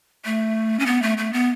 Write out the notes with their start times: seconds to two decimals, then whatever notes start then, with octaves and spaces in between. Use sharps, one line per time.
0.25 A3
0.79 C#4
0.86 B3
1.02 A3
1.18 A3
1.33 B3